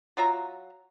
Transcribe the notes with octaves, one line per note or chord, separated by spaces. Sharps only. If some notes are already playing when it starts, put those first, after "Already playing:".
F#3 F4 E5 A#5